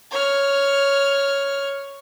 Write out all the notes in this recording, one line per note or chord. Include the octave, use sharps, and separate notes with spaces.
C#5 F6